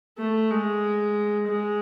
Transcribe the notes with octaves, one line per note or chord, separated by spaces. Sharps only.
A3
G#3
G#3